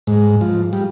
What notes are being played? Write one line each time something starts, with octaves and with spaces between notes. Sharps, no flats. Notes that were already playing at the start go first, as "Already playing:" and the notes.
G#2
F3
G3